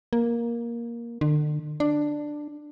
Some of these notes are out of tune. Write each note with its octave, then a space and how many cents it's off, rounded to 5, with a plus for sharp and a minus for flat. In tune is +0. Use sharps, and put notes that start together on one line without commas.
A#3 +10
D3 +40
D4 +10